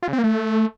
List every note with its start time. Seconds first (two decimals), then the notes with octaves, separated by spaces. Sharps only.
0.03 F4
0.08 C#3
0.13 C4
0.18 A#3
0.24 A3